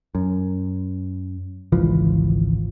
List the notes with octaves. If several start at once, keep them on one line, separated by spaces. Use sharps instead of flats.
F#2
G#1 C#2 E3 F3